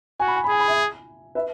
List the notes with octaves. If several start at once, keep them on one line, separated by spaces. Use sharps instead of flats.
F#4 G#5
B5
G#5
B5
G#4 G#5
B5
E5 G#5
B4 E5